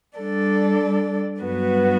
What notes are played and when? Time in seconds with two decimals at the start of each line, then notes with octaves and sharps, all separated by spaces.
0.20 G3 D4 A4 D5
1.42 G2 F#3 B3 F#4 B4